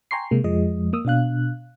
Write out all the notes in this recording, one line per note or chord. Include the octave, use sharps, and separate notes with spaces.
G5 G#5 A#5 C6 C#6 C7
C3 G#3 A#3
F2 F3 G#3 D#5
A#3 D#6 E6
B2 D4 F5 F#6